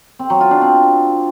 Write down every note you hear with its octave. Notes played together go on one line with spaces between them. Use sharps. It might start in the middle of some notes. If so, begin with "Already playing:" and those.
C4
F#3
F4
D4
C4